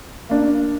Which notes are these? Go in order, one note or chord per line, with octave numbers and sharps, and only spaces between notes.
A#3 D4